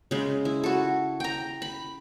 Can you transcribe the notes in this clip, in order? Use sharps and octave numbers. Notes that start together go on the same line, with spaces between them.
C#3 G#3
E4
F#4 A4
G5 A#5
B5